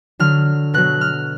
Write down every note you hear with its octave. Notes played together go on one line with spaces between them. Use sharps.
D3 F#3 F6
B2 F#3 F#6
F6